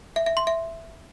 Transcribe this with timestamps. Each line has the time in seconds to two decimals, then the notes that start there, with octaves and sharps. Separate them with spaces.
0.16 E5
0.26 E5
0.37 C6
0.47 E5